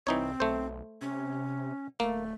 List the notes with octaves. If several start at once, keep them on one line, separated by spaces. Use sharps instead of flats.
C2 E3 C4 D#4 C#5
B1 A3 C5
C3 C#4
D1 A3 A#3